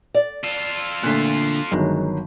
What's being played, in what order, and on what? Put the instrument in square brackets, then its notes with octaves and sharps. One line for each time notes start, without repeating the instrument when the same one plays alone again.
[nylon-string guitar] D5
[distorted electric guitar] F4 A4
[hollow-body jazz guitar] A#2 D3 A3 [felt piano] F#6 B6
[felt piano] G1 D#3 F#3 [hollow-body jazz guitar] G#3